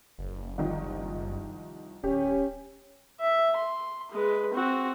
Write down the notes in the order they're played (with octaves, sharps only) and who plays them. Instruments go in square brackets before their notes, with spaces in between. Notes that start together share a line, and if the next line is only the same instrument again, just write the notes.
[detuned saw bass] F#1
[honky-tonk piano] C2 D#3 F3
[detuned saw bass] D1 [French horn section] C#4 [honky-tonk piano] G4
[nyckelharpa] E5
C6
G#3 B4
C4 F#4